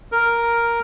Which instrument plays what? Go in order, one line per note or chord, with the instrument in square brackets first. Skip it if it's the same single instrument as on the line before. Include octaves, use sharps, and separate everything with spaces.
[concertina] A#4